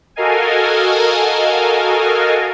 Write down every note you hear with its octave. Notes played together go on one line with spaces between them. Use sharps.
F#4 A4 A#4 D#5 F5 G#5